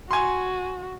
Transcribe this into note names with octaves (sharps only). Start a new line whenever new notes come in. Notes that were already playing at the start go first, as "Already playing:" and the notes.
F#4 G#5 C6